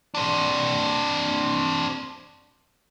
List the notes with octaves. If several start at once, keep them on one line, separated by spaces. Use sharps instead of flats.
C4 D4